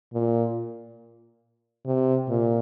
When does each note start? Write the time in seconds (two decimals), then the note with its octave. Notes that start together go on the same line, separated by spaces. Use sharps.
0.13 A#2
1.86 C3
2.29 A#2